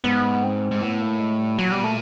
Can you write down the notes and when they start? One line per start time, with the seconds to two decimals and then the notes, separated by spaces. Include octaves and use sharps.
0.04 G#2 B3
0.44 C4
0.71 G#2
0.81 A2 B3
1.01 A#3
1.20 G#3
1.39 G3
1.59 A#2 F#3
1.70 B2 G3
1.81 A#2 A3